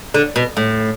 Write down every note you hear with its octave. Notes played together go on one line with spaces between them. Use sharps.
D3
B2
A2